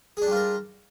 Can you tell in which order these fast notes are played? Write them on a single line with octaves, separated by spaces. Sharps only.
G#4 D4 G3 F4 A#4